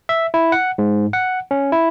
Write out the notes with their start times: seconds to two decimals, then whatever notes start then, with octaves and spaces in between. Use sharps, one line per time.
0.09 E5
0.34 E4
0.52 F#5
0.78 G#2
1.13 F#5
1.51 C#4
1.72 E4